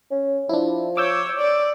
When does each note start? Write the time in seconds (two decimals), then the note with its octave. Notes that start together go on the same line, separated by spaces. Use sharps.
0.11 C#4
0.49 F3 D4 E4
0.97 C#5 D6 E6 G6
1.39 D5